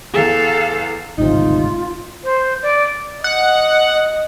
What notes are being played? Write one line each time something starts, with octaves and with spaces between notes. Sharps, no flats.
E2 G#4 A4 F5
D1 G#1 C3 D#4 F4
C5
D5
D#5 F#5